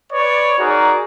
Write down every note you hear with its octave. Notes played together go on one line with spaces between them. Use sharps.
B4 C#5 D5
D#4 F#4 G#4 A#4 D5